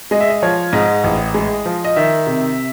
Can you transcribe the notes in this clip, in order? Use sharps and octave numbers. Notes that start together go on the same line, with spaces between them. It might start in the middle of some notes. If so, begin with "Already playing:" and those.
G#3 D#5
E5
D#5
F3 C#5
G#2 D#5
A1
G#3
F3
D#5
D#3 E5
C3